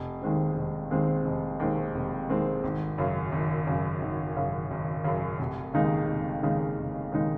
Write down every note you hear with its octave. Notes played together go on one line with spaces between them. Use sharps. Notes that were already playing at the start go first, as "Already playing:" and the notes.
Already playing: F1
D#2 D#3 G#3 C4
F1
D#2 D#3 G#3 C4
F1
D#2 D#3 G#3 C4
F1
D#2 D#3 G#3 C4
G#1
F#2 C#3
G#1
F#2 C#3
G#1
F#2 C#3
G#1
F#2 C#3
F1
D#2 C#3 G#3 D#4
F1
D#2 C#3 G#3 D#4
F1
D#2 C#3 G#3 D#4